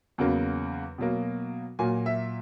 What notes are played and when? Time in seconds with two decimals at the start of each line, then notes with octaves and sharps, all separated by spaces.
0.18 E2 C#3 F#3 A#3
0.98 B2 F#3 A#3
1.79 A#2 F#3 A#3 G#5
2.06 E5